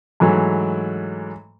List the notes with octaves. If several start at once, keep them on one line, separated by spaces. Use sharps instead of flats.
G#2 E3 F#3 A3